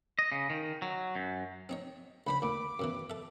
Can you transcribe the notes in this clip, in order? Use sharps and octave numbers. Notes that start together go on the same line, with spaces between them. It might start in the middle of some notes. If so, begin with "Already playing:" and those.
D#5
C#3
D#3
F#3
F#2
C4 D#4 C#5
C#2 D4 C5 B5
D2 A#2 D6
F#2 B2 E3
A4 E5